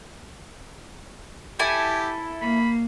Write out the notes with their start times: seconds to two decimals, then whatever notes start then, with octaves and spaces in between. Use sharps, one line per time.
1.59 E4 G4 A4 G#5
2.42 A#3 B5